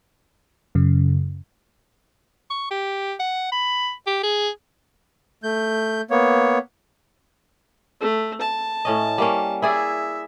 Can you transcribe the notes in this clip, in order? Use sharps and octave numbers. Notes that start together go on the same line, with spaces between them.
F#2 C#3
C#6
G4
F#5
B5
G4
G#4
A3 G6
A#3 B3 C#5
A3
A5
A2 C#4 D#5
G3 A#3 C#4
E4 G#4 D5 E5